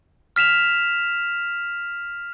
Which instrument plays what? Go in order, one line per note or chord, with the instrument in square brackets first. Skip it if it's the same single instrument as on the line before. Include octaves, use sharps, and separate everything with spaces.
[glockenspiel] F6 B6 E7 F7